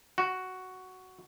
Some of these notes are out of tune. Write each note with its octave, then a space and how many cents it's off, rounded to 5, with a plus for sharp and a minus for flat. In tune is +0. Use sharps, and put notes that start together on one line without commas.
F#4 +5